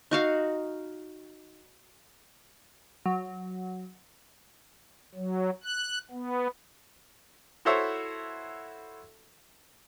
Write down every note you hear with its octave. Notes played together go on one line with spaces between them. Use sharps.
D#4 F#4 F5
F#3
F#3
F#6
B3
E4 F#4 A4 C5 C#5 E5